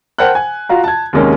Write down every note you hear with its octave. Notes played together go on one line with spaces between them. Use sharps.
A#4 C5 F#5 G5 A5 F#6
G#5
F4 F#4 F5 A#5
A5 G#6
D#2 C3 G#3 A#3 C#4